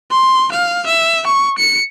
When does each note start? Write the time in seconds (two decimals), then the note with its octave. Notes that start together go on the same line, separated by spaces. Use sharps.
0.11 C6
0.52 F5
0.87 E5
1.27 C#6
1.58 C#7